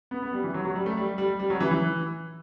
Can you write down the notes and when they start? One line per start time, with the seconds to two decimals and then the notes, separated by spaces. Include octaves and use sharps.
0.11 B3
0.22 B3
0.33 G3
0.44 E3
0.54 F#3
0.65 F#3
0.75 G3
0.86 A3
0.97 G3
1.18 G3
1.40 G3
1.50 F#3
1.60 E3
1.71 E3